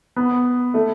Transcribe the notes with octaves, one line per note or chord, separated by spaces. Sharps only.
B3
A3